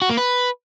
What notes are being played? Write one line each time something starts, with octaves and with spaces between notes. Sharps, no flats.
F#4
A#3
B4